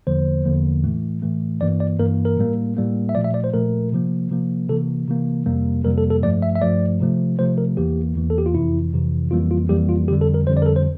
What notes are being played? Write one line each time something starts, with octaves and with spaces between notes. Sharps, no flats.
E2 D3 F3 A#3 C5
E2 D3 F3 A#3
A2 E3 A3
A2 E3 A3
G2 E3 A#3 D5
D5
G2 E3 A#3 A#4
A#4
A2 G3 A#3
A2 G3 A#3
E5
A#2 F3 A3 D5
E5
D5
C5
A#2 F3 A3 A#4
C3 F3 A#3
C3 F3 A#3
C3 E3 A#3 A4
C3 E3 A#3
F2 C3 G3 A#3
F2 C3 G3 A#3 A#4
A4
A4
G2 F3 A3 D5
E5
E5
G2 F3 A3 D5
C3 F3 A3
C3 F3 A3 C5
A#4
E2 E3 A#3 G4
E2 E3 A#3
A4
G4
F4
F2 C3 E3 E4
F2 C3 E3
F2 E3 G3 A#3 F4
F4
F2 E3 G3 A#3 G4
F4
F2 D3 G3 G4
A4
A#4
F2 D3 G3 C5
D5
A#4
A4
C5